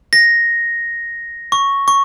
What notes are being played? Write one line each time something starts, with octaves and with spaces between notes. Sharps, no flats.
A#6
C#6
C#6